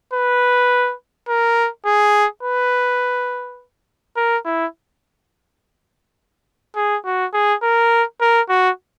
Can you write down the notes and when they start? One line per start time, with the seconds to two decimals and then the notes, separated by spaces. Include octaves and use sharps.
0.13 B4
1.28 A#4
1.86 G#4
2.43 B4
4.17 A#4
4.45 E4
6.76 G#4
7.05 F#4
7.34 G#4
7.62 A#4
8.21 A#4
8.49 F#4